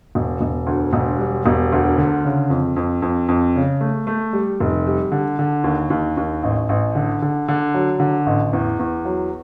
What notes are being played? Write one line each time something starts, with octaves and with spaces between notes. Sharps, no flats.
E1
E1
D2
E1
G3
E1
D2
D3
C#3
F2
F2
F2
F2
C#3
A3
A3
G3
F1
G3
D3
D3
D#2
D#2
D#2
A1
A1
D3
D3
D3
F#3
D3
A1
E2
E2
F#3